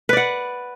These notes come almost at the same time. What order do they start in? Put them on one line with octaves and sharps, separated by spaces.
B4 D5 F#5